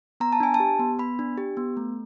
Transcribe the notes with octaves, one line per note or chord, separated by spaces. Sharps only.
B3 A#5
A5
D4 G#5
A5
G4
B3
B3 B5
D4
G4
B3
A3